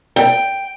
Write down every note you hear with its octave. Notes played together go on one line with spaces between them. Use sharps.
G5